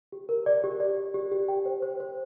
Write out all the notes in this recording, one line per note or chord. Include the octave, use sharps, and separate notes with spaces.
G4
A#4
D5
G4
D5
D5
G4
G4
G5
C5
C5
C5